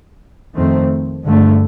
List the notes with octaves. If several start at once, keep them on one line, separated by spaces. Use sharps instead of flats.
F2 D#3 A3 C4
G2 D3 A3